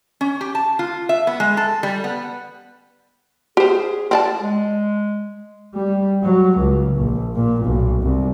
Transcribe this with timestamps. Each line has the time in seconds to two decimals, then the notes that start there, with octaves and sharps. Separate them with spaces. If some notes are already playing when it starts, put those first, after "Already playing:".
0.21 C#4
0.41 G4
0.55 A5
0.79 F4
1.09 E5
1.27 B3
1.40 G#3
1.57 A4
1.83 G3
2.04 B3
3.57 G4 G#4 C5
4.11 C4 D5 A5
4.41 G#3
5.74 G3
6.24 F#3
6.58 C#2
6.97 A#1
7.36 A#2
7.66 B1
8.02 C2